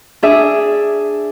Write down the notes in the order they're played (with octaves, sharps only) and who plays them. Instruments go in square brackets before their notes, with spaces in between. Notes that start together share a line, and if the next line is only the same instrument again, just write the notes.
[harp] D4 G#4 E5